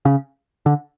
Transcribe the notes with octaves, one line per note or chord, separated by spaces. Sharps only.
C#3
D3